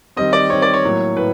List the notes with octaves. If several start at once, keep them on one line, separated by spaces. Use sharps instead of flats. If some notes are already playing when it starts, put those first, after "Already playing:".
D#3 G3 C4 D#5
D5
D#3 G3 C4 C#5
D5
C#5
A2 F#3 A#3
A2 B4